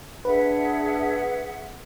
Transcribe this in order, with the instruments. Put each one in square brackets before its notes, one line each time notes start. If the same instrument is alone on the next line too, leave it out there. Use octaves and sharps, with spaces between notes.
[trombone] D4 [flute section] G#4 E5 F#5 [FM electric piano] B4